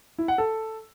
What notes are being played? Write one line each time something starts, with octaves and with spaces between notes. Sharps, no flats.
E4
F#5
A4